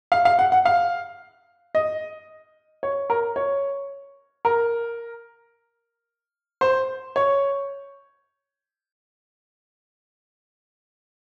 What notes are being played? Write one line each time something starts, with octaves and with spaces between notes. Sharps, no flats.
F5
F5
F#5
F#5
F5
D#5
C#5
A#4
C#5
A#4
C5
C#5